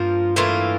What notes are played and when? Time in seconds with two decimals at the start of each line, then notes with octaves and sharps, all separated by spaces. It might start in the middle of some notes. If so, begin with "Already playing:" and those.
Already playing: G2 F3 A#3 F4
0.36 A2 E3 A#3 F4